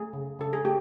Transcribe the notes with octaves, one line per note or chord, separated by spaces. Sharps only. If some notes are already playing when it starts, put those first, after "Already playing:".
Already playing: A3 G#4
C#3
C#3 A4
G#4
A3 G4